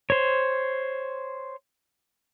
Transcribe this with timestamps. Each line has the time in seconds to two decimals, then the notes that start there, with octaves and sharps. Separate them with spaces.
0.10 C5 C#5